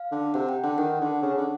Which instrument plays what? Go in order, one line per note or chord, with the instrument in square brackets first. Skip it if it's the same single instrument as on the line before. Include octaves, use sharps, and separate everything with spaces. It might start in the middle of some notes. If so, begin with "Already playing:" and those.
Already playing: [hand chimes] F5
[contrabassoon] D3
[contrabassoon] C3 [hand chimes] F#5
[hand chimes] G5
[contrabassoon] D3 [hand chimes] F#5
[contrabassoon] D#3 [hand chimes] F#5
[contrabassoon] D3
C#3
D3